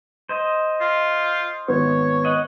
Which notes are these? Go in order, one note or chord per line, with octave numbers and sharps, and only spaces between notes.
C5 D#5
F4
G#1 B3 C#5
D#5 F#5